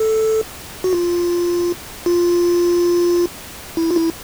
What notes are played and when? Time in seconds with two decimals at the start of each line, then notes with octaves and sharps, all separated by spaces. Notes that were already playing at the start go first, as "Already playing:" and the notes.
Already playing: A4
0.84 F#4
0.93 F4
2.06 F4
3.77 E4
3.91 F4
3.96 E4